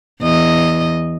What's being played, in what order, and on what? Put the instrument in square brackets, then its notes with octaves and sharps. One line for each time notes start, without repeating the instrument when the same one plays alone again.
[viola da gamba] E2 D#5